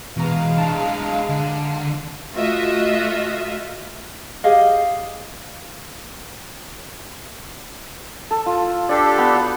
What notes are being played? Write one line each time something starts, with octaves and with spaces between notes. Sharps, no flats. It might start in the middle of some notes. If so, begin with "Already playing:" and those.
B2 E3 G#3 F5 A#5
D4 E4 A5 A#5
D3
A3 F4 F#4 D#5 E5
G4 G#4 D#5 F5
A4
F4
D4 G4 A4 D5
B3
F#4 B5